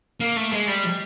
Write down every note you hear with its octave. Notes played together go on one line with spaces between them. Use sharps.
A#3
A3
G#3
G3